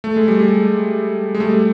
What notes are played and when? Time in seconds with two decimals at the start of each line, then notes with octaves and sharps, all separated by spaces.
0.04 A3
0.16 G#3
0.28 G3
0.41 G#3
1.35 G#3
1.40 G3 A3